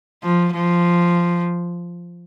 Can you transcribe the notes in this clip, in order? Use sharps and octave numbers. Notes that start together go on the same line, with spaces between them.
F3
F3